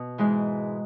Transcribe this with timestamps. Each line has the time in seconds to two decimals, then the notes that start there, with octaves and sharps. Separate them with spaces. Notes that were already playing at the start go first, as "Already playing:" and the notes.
Already playing: B2
0.18 G#2 E3 G#3